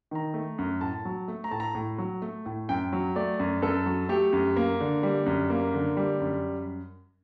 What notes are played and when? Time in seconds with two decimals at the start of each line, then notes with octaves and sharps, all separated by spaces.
0.11 D#3 A#5
0.34 A3
0.58 F#2
0.81 A2 A5
1.05 F#3
1.28 A3
1.44 A#5
1.51 A2 A5
1.60 A#5
1.75 A2
1.98 F#3
2.22 A3
2.46 A2
2.69 F#2 G5
2.93 F#3
3.16 A3 D5
3.39 F#2
3.62 F#2 A4
3.86 F#3
4.09 A3 G4
4.33 F#2
4.56 A#3
4.80 D3
5.03 G3
5.26 F#2
5.50 A#3
5.74 D3
5.97 G3
6.20 F#2